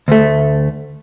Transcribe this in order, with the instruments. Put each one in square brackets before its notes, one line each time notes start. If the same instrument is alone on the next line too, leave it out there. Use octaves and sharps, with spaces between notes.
[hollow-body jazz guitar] D2 A3